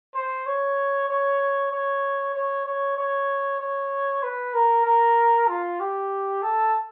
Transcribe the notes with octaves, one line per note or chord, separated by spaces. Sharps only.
C5
C#5
C#5
C#5
C#5
C#5
C#5
C#5
B4
A#4
A#4
F4
G4
A4